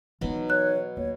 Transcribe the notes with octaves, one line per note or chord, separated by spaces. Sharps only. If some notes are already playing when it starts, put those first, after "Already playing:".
B2 E3 F#3 D#4 B5
C#5 F#6
D#2 C#5